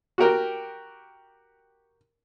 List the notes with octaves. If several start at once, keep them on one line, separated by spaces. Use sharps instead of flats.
F#4 G4 A#4 G5